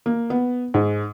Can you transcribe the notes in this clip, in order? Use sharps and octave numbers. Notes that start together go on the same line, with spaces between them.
A#3
B3
G#2